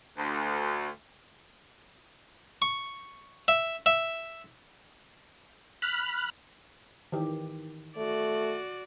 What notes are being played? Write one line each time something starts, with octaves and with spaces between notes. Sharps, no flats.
D2
C#6
E5
E5
B5 F6 F#6
D#3 E3 G4
A3 F#4 D5